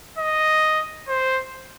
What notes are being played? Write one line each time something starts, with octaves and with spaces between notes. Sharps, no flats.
D#5
C5